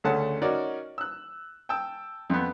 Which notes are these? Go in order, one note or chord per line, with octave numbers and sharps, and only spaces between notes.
D2 C#3 A3 C#4 F#5 A5
C#4 D#4 F#4 A#4 D5
E6 F#6
G5 A5 E6
F2 B3